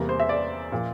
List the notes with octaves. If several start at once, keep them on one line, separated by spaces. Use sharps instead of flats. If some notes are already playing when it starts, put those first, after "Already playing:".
Already playing: E2 C3 G3 A#3
C5
E5
D5
A#2 F3 A#3